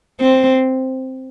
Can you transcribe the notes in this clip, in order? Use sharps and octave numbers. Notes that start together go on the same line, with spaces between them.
C4